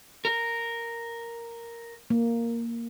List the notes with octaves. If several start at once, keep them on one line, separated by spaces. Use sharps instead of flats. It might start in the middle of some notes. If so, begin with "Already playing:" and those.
A#4
A#3